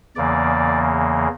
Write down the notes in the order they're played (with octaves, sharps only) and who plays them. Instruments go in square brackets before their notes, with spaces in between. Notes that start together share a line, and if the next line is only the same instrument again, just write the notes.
[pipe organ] E2 C#3 E3 A#3 D5